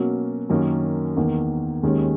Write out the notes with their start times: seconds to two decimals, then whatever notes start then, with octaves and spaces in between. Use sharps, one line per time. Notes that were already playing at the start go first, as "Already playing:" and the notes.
Already playing: B2 F#3 A#3 C#4
0.49 F#2 D#3 A#3 C#4
1.16 E2 D#3 A#3
1.83 D#2 D#3 G#3 C#4